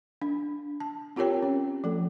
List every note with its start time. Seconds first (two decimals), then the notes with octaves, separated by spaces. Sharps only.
0.22 D4
0.80 A5
1.16 C4 F4 G4 A#4 C#5 G5
1.43 C#4
1.84 F3 A3 A4